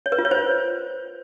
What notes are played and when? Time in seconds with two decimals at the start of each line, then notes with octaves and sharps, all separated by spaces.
0.06 C#5
0.12 B4
0.18 F4
0.25 C#5
0.31 C5